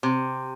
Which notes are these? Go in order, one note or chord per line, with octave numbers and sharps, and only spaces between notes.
C3